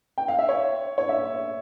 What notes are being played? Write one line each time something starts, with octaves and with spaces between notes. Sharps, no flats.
G5
F5
E5
C#5
C#5
E5